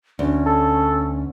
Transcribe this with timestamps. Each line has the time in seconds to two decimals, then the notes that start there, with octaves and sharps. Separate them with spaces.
0.19 D2 C#4
0.46 A4